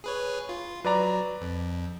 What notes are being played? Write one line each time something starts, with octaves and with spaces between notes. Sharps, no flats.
G#4 B4 C#5
F4
F#3 B4 D5 A#5
F2